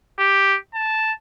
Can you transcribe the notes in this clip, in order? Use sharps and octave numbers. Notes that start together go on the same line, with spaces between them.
G4
A5